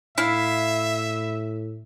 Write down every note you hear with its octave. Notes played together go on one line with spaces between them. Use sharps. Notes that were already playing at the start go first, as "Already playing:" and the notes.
A2 E4 E5 F5